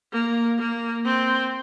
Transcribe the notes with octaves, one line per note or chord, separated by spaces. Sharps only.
A#3
A#3
C4